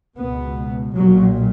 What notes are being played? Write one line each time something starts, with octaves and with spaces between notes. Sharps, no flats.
C#2 B2 B3
B1 A#2 F#3